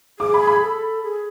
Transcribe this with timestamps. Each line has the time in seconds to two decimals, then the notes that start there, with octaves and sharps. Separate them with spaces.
0.19 G#4 D6
0.34 B5
0.47 B5
0.62 A4
1.03 G#4